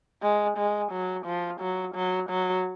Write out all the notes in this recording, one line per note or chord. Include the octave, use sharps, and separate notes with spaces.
G#3
G#3
F#3
F3
F#3
F#3
F#3